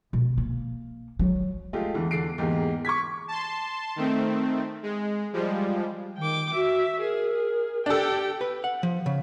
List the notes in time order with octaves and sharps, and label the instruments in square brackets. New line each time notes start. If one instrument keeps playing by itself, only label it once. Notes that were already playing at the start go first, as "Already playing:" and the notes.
[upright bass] B2
A#3
F#3
[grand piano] G#3 A3 F4 G4
E2 D3 E3
E2 D3 C7 D7
E2 G#2 A#3 G4
C#6 D6 G#6 B6
[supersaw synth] A5 C6
D#3 A3 C4
G#3
F3 G3 G#3
[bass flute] D#3 [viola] G5 D6
[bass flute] F#4 [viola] E5
[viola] G#4 [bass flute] A#4
[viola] G#4
[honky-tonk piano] D4 A4 [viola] G4 G5
[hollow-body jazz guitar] B4
F#5
F3
C#3